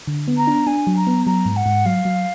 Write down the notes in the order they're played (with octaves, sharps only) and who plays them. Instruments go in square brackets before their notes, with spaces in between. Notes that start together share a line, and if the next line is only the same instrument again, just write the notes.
[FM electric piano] D3
B3
[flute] A#5
[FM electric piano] D4
[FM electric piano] D4 [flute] G#5
[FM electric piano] F#3
[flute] A#5
[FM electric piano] B3
[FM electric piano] F#3 [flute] A#5
[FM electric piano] G#2
[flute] F#5
[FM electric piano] G#2
[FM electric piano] F#3 [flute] F5
[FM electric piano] F#3